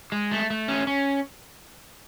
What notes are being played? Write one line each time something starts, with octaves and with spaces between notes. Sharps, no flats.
G#3
A3
A3
C#4
C#4